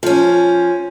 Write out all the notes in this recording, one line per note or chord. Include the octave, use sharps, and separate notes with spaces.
F3 C#4